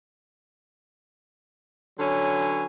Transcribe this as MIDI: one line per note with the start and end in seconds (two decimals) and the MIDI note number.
1.99 2.66 50
1.99 2.66 54
1.99 2.66 61
1.99 2.66 71
1.99 2.66 80